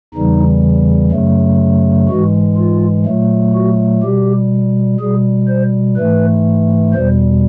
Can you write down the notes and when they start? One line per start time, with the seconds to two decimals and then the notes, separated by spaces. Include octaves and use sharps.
0.14 E2 C#3 E3 G3 D#4
1.11 F#2 C#3 F#3 A3
2.08 G#2 E3 G#3 F#4
2.57 F4
3.06 A#2 F#3 A3
3.54 F#4
4.02 B2 G3 G4
5.00 B2 G3 G#4
5.48 C5
5.97 G#2 E3 A3 B4
6.94 E2 B2 G3 C5